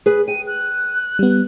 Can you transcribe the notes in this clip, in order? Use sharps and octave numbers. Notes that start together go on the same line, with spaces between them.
G#4 B4
G5 D#7
F#6
G3 B3